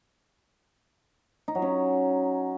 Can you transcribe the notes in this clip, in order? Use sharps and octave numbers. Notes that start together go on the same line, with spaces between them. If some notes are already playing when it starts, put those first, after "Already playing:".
D#4
F#3
C#4